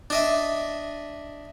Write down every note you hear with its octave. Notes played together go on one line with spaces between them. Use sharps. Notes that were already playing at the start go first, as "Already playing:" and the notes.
D4 D#5 E5